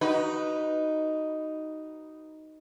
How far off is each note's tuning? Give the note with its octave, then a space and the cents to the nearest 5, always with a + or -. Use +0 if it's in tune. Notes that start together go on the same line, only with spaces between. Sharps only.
D#4 +0 F#4 +25 B4 -10